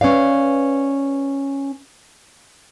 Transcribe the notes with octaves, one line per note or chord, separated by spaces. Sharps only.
C#4 B4 D5 F5